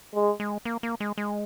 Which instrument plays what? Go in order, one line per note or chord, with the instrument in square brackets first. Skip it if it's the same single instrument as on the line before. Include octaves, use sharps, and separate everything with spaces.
[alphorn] G#3
[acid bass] G#3
A#3
A#3
G#3
G#3